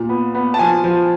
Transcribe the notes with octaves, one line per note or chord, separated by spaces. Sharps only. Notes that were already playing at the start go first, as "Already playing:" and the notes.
Already playing: A#2
B3
B3
A5
F3 G#5
F3